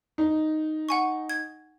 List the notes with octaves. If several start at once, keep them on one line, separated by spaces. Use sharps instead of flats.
D#4
F#5 G#5 C#6
G#6